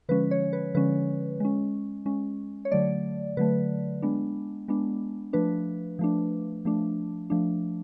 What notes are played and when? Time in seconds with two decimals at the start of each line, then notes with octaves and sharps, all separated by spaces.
0.09 D3 F3 G#3 C#4 B4
0.31 C#5
0.53 B4
0.75 D3 F3 G#3 C#4 B4
1.40 G#3 C#4
2.06 G#3 C#4
2.65 C#5
2.71 D3 F#3 A3 D5
3.37 D3 F#3 A3 B4
4.02 G#3 B3 D4
4.68 G#3 B3 D4
5.33 F3 A3 D4 B4
5.99 F3 A3 D4
6.65 F3 A3 D4
7.30 F3 A3 D4